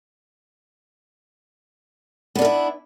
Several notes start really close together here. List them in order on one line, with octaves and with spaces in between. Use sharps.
B3 D4 A#4 E4